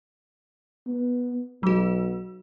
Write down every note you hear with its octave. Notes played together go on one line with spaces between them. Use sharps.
B3
B1 F#3 F#4